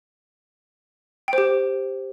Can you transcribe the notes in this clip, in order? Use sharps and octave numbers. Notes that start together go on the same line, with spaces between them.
G4 C5 G5